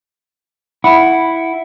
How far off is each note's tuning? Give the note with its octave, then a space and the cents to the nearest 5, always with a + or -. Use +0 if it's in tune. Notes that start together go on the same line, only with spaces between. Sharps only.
E4 +0 F#5 +0 B5 +0